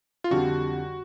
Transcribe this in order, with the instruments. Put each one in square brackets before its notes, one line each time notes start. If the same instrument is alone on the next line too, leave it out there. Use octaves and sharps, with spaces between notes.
[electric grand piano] F4
[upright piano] F2 D3 G3 [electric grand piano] F#4